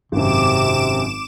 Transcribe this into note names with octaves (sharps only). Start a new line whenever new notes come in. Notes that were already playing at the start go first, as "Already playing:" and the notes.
G#1 F#2 C3 D6 E7